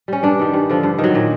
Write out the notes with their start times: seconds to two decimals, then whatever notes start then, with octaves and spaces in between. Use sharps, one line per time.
0.08 G3 C#4
0.23 G2 D4
0.39 D#3 G3
0.54 G2
0.69 D3 F3
0.83 G2
0.98 D#3
1.04 F#3
1.15 A#2